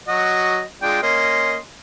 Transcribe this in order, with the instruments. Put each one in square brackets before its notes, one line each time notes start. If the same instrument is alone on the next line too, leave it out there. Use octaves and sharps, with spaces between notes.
[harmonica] F#3 F#4 [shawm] D#5
[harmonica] G#3 D4 F4 [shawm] G5
[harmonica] A#3 C#4 D#5 [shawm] C6